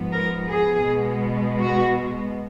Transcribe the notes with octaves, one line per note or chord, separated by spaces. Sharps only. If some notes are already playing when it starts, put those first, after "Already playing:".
Already playing: G#2 F3 B3
A#4
G#4
B2 G#3 B3
F#4